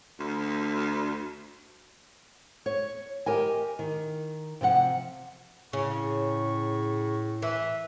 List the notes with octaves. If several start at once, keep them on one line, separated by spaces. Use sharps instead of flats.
D2
C#5
G4 A#4 D#5 G#5
D#3
C3 F3 D5 F#5
A2 C#3 C#6
E3 E5